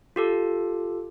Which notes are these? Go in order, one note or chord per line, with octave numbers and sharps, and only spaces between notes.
F4 G4 A4